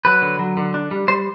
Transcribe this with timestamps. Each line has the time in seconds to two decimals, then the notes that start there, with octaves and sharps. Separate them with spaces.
0.05 F#3 B4
0.22 D3
0.39 F#3
0.57 D3
0.74 D4
0.91 G3
1.08 G3 C5